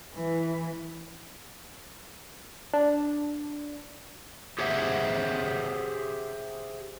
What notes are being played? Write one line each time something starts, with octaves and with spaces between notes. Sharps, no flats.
E3
D4
G4 G#4 C5 E5 F#5